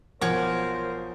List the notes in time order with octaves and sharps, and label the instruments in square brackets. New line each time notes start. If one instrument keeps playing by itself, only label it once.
[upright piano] B1 F3 G#5 [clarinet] A#4 [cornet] C5 [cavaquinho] C#5 F#5 D6